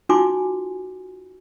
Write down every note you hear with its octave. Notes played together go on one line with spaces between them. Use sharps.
D#4 F4 F#4 G#5 C6 D6